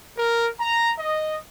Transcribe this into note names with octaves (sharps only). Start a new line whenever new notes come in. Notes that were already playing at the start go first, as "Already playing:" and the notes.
A#4
A#5
D#5